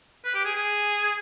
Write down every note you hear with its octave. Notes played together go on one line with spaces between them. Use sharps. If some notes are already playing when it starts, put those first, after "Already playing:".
B4
G4
G#4
G#4